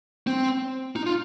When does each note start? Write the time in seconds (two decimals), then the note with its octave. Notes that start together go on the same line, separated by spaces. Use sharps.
0.27 C4
0.96 D#4
1.06 F4